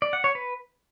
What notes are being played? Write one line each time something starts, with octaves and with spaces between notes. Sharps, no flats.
D5
F#5
C#5
B4